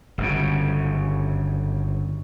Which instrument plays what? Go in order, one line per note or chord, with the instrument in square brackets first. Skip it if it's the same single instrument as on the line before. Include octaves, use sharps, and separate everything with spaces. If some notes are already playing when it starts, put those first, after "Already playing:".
[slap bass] G1 F#2 C#3